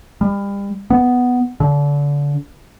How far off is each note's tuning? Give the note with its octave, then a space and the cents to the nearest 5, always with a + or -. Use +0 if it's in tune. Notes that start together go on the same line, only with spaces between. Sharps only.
G3 +35
B3 +5
D3 -30